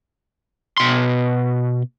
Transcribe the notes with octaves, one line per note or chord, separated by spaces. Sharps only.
B2 C6